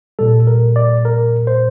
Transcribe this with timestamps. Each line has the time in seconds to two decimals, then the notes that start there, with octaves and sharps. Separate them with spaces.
0.19 A#2 G3 A4
0.47 A#4
0.76 D5
1.05 A#4
1.47 C5